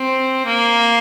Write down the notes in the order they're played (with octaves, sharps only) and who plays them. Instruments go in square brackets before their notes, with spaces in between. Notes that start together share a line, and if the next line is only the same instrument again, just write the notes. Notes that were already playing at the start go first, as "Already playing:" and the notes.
Already playing: [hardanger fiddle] C4
A#3